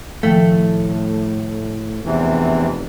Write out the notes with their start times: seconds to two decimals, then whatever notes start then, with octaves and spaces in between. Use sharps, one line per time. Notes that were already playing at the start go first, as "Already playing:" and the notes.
0.23 A2 D#3 F3 A3 G5
2.05 F1 E2 C3 E3